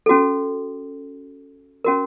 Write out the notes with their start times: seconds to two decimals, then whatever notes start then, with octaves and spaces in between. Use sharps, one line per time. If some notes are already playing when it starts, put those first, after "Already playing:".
0.06 C#4 F#4 A4
1.84 C#4 F#4 A#4